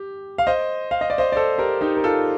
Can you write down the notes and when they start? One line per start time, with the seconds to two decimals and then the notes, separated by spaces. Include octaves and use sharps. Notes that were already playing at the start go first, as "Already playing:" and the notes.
Already playing: G4
0.38 F5
0.47 C5 D#5
0.91 F5
1.01 D#5
1.10 D5
1.18 C5 D#5
1.32 D5
1.36 A4 C5
1.58 G4 A#4
1.81 D#4 G4
1.97 A#4
2.04 F4 A4